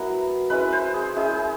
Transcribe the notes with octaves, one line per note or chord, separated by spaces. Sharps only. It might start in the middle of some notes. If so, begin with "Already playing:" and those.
Already playing: F#3 B3 E4 A#4
G#3 C#4 E4 B4
C5
G#4
G#3 C#4 E4 G#4